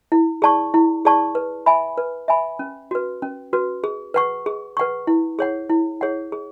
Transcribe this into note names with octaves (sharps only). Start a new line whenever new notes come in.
E4
G#4 D5 A5 C#6
E4
G#4 D5 A5 C#6
B4
E5 G#5 B5
B4
E5 G#5 B5
C#4
F#4 B4
C#4
F#4 B4
G#4
B4 F#5 C#6
G#4
B4 F#5 C#6
E4
G#4 C#5 F#5
E4
G#4 C#5 F#5
G#4